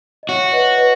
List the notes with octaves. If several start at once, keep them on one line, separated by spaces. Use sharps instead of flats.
D#5
F#4 C#5 E5
B4 D#5
B4 D#5